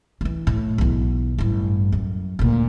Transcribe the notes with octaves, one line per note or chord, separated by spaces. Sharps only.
E3 F#3
A2
B1 E2
A1 G2
F#2
D2 A#2